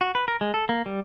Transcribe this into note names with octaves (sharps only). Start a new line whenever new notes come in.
F#4
B4
A#4
G#3
A4
A#3
G3